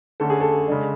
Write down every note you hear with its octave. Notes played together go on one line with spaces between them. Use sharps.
D3 A3 C#4 A4
G#4
A4
C#3 G#3 D4